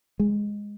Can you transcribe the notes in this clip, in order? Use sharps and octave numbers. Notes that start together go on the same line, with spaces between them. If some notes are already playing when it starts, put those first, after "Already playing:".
G#3